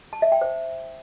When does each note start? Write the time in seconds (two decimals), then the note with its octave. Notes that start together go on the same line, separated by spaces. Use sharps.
0.13 A5
0.22 E5
0.32 G5
0.41 C5